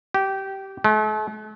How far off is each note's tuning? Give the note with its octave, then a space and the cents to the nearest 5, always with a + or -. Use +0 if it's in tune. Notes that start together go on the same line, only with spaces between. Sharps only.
G4 -15
A3 -45